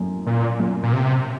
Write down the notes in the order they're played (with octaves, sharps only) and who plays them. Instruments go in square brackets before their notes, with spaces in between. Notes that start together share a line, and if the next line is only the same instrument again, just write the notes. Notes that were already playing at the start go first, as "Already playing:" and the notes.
Already playing: [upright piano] F#2 A2
[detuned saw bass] A#2
[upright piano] F#2
[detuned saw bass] A#2
C3